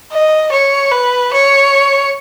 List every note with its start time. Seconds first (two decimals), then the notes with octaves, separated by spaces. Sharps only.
0.12 D#5
0.52 C#5
0.92 B4
1.33 C#5